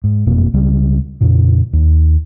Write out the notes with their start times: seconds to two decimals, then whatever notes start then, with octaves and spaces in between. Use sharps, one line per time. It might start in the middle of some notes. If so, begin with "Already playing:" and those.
0.04 G#2
0.26 F#1 F2 B2 A#3
0.53 C#2 C#3 G3
1.21 F2 A#2 C#3
1.73 D#2